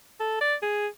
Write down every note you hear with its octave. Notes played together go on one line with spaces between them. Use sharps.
A4
D5
G#4